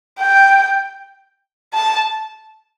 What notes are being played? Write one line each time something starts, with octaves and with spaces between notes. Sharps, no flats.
G5
A5